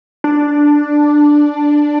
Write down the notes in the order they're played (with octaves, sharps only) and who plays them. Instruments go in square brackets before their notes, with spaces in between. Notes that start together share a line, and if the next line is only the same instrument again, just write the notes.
[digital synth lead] D4